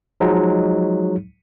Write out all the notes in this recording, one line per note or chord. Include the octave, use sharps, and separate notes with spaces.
F3 F#3 G#3 D#4